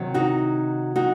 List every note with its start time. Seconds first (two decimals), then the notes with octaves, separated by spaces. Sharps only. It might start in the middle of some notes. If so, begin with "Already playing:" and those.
Already playing: C3 D#3 F#3
0.14 D#4 F#4
0.96 D#4 F#4